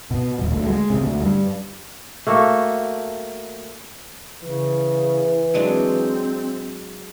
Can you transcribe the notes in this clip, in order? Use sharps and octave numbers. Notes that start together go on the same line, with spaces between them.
B2
D#1
D2
G#3
C3
D2
G2
A3 A#3 F#4 A4
C#3 E3
F#3 G#3 C4 D4